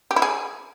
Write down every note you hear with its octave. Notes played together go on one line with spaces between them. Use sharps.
G4
E4
G#4